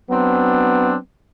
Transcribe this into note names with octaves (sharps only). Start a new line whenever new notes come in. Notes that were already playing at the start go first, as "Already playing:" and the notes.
F#3 B3 C4 D4